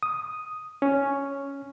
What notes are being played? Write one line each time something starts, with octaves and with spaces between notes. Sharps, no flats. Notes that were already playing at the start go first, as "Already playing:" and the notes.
D#6
C#4